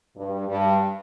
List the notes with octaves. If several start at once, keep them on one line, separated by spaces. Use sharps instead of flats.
G2
G2